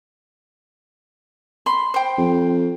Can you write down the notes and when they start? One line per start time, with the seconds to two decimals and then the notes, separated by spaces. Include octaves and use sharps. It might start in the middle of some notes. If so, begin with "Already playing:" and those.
1.66 B5 C6
1.94 C5 G5
2.18 F2